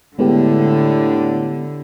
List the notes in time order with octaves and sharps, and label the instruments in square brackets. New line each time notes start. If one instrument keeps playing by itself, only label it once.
[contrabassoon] A2 [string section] D3 [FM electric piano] G#3 B3 G4